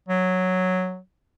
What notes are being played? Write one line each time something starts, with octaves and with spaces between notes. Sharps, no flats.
F#3